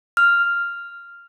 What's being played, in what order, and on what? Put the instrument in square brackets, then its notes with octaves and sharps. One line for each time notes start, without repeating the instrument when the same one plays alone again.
[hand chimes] F6